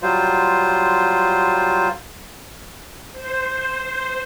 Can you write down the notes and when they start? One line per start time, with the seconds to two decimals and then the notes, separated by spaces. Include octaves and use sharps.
0.02 F#3 G3 F4 C5
3.12 C5